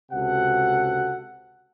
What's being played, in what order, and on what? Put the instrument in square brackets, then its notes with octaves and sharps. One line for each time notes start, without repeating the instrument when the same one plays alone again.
[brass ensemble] C#2 C3 F#4 A4 F#5